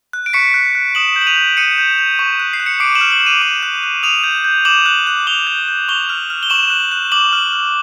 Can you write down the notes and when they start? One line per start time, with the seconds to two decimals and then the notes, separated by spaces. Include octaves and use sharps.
0.13 F#6
0.26 D7
0.33 C#6 B6 C#7
0.54 F#6
0.75 F#6
0.95 D#6 E7 F#7
1.16 G6
1.21 F#7
1.27 D#7 F7
1.36 G6
1.57 D#6 C#7 D#7
1.78 G6
1.98 G6
2.19 C#6
2.40 F#6
2.53 C7
2.60 F#6
2.66 C#7
2.80 D6 C7 D7
2.95 E7 F#7
3.01 F6
3.11 E7 F#7
3.21 F6
3.26 D#7 F7
3.42 D6 D7 E7
3.63 F#6
3.84 F#6
4.03 D#6 D#7 F7
4.24 G6
4.44 G6
4.65 D6 E7 F#7
4.86 F#6
5.07 F#6
5.27 D6 F7 G7
5.47 G6
5.68 G6
5.89 C#6 F7 G7
6.09 F6
6.30 F6
6.43 G7
6.50 C#6 E7 F#7
6.70 F#6
6.92 F#6
7.12 D6 E7 F#7
7.33 F6
7.52 F6